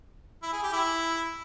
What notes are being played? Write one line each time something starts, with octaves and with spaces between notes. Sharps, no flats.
E4
G#4
G4
E4